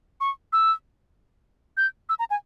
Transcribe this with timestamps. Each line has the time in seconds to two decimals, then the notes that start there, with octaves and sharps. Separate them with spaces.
0.21 C#6
0.53 E6
1.77 G6
2.09 E6
2.19 A#5
2.30 G#5